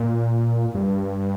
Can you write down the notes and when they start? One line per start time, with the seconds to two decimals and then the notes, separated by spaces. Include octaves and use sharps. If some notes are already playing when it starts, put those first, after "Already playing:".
Already playing: A#2
0.74 G2